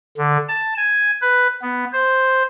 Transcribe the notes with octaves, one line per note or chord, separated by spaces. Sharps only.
D3
A5
G#5
B4
B3
C5